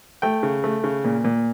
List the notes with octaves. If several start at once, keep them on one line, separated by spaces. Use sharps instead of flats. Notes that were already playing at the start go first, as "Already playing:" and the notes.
A3 G5
C#3
A3
C#3
A#2
A#2